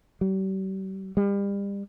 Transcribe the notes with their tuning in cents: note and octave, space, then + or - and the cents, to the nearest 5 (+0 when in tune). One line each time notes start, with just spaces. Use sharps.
G3 -40
G3 +35